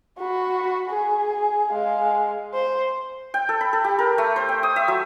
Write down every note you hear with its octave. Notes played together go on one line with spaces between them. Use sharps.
F#4 B5
G#4
G#3 F5
C5
G5
A4
B5
A4
G4
A#4
A3
C5
G5
D#6
E5
F#3